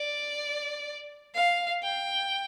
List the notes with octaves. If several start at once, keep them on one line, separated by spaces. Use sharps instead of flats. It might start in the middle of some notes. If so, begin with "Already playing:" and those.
Already playing: D5
F5
G5